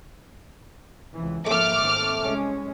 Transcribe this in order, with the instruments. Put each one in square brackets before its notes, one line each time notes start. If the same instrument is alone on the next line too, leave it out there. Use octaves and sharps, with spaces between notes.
[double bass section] C#2 C3 E3
[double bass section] G#2 F3 A#3 [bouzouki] A3 [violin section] D6 F6
[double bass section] G#2 D#3 C4
C2 G#3 C#4